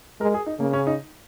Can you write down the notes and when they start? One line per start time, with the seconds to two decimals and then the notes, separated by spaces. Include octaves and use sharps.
0.21 G#3 A#4
0.34 G#4
0.46 D#4
0.60 C#3 A#3
0.73 C#4
0.87 D#4